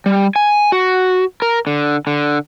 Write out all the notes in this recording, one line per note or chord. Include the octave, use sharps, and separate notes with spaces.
G3
G#5
F#4
A#4
D3
D3